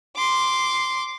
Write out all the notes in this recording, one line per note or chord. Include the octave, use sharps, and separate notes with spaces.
C6 D6